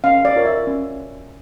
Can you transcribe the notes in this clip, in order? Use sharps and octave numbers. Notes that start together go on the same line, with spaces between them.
C#4 F5
D5
F4 A#4 C#5
E5
C#4